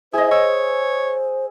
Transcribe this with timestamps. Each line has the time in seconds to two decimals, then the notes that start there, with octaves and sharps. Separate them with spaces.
0.13 E4 G#4 C5 D#5
0.31 C#5 E6